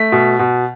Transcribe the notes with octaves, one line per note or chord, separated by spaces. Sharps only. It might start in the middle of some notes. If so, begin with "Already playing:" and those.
Already playing: A3 B6
B2
B2